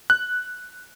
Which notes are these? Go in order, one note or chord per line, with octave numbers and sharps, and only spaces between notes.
F#6